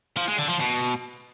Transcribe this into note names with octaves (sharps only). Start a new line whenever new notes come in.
F3
G#3
D3
F3
B2